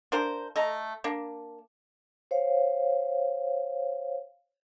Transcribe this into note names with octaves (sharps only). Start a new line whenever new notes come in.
D4 F4 A#4 C5
A3 D#5 A#5
A#3 D4
C5 C#5 F5